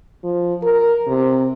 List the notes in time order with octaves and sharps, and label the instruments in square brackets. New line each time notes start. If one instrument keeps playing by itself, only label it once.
[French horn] F3
A#4
C3